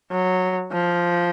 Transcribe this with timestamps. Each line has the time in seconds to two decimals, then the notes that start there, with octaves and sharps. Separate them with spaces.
0.11 F#3
0.73 F3